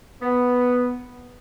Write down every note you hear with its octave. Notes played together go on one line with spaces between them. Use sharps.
B3